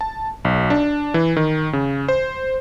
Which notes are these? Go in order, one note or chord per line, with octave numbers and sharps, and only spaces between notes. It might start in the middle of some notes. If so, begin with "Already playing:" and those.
A5
B1
D4
E3
D#3
C#3
C5